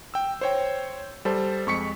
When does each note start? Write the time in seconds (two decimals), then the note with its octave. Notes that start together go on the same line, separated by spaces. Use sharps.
0.14 G5 E6
0.41 C5 C#5 G5
1.25 G3 A4 C5 A5
1.67 F2 G#3 C#6 B6 C#7